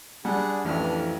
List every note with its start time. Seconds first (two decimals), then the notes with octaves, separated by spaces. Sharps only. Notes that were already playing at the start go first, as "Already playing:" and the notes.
0.25 G3 D4 G#4 F#5
0.65 A1 F2 E3 D4 F6